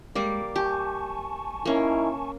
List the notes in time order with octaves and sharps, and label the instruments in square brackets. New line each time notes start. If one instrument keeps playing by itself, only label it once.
[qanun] G3 A#3 D5 [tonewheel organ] G#3
[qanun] G4 [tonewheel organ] G#5 A5 C#6
[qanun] A#3 C#4 [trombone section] D#4 E4 A#4